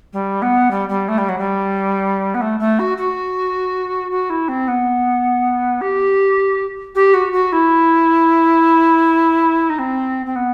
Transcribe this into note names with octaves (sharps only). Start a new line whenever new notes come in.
G3
B3
G3
G3
A3
G3
F#3
G3
B3
A3
A3
F#4
F#4
F#4
E4
C4
B3
G4
G4
F#4
F#4
E4
D#4
C4
C4
B3